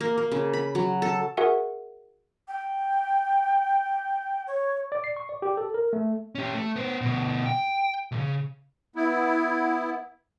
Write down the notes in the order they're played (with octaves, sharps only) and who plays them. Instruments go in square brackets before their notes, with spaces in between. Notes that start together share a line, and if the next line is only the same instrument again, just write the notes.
[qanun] A#3
A#3
C#3
B5
F#3
A4
[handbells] F#4 G#4 A#4 E5 F#5 G#5
[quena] G5
C#5
[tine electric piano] D5
C7
C#6
D5
G4
A4
A#4
A3
[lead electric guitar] C#4 G4
A3
B3 C5
D2 B2
G5
C2 C#3
[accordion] B3 E4